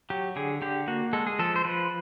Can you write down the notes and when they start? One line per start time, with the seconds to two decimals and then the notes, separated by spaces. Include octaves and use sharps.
0.10 F#3 G4
0.36 D3 G#4
0.62 D3 G4
0.87 A#3 F#4
1.13 G#3 A4
1.27 G#4
1.39 F3 A4
1.56 C5
1.65 F3 B4